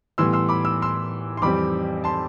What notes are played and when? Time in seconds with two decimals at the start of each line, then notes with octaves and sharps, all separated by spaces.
0.18 A2 E3 G3 B3 C6 E6
0.33 C6 E6
0.49 B5 D6
0.65 E6
0.82 C6 E6
1.37 C6
1.42 F2 E3 G3 C4 B5 D6
2.04 A5 C6